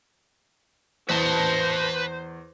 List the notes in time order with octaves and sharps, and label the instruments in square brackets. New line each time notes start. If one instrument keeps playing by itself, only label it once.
[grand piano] E2 [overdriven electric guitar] B4 A5 [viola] C5